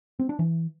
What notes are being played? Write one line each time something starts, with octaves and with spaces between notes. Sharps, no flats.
C4
D4
E3